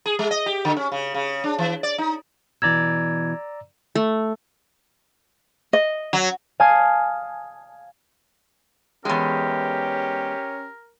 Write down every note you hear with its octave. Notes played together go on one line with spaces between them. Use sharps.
G#4
G#3
D#5
G4
D3
C#4
C#3
C#3
D4
E3
D5
D#4
B2 E3 D5 A#5 E6 G#6
A3
D#5
F#3
F5 G#5 A5 D#6 G#6 C7
E2 G#3 C#4 G4 A#4